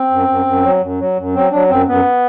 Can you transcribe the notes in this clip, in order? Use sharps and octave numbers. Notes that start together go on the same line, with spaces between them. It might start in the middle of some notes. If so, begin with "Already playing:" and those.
Already playing: C4
F#2
F#2
F#2
F#3
F#2
F#3
F#2
F#3 C4
F#3 D4
F#2 C4
F#2 B3